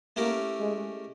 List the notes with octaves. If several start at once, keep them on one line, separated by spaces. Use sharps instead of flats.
A3 A#3 C#4 E4 G4 A#4
G#3